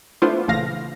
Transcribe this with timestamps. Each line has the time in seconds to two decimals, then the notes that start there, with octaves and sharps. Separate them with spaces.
0.22 A3 B3 D4 E4 F4 C5
0.48 A#1 C#3 E3 A3 F5 A#6